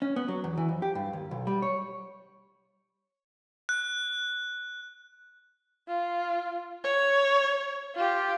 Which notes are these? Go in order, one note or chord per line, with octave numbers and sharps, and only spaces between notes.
C#4
B3
F#3
E2
E3
F2
G4
G2
D#2
B1
G3
C#5
F#6
F4
C#5
F4 G4